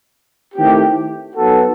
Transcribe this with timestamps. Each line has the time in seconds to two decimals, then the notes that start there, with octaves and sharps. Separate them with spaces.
0.55 D#3 A3 C4 E4 G4
1.35 F#3 B3 D#4 F#4 A4